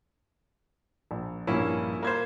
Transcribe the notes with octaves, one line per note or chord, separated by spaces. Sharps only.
A#1
A#1 G2 A#2 A#3 C#4 E4
A#3 C5 A#5 B5 G#6